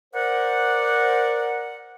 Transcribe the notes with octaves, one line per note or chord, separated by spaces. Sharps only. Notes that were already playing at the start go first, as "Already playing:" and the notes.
A#4 C5 D5 F#5